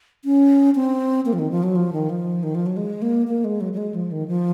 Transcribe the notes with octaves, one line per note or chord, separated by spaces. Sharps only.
C#4
C4
A#3
F3
D#3
F3
F#3
F3
D#3
F3
D#3
F3
F#3
G#3
A#3
A#3
G#3
F#3
F#3
G#3
F3
D#3
F3